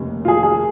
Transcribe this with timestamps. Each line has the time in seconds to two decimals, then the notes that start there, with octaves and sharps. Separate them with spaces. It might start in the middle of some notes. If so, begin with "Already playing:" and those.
Already playing: F1 D#2 C#3
0.25 F4
0.28 G#4
0.43 G#4